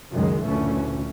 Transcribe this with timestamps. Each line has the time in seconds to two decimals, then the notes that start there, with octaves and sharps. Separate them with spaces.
0.13 C#2 F#2 D#3 G#3
0.45 F#1 D2 A#2 E3 A3 C#4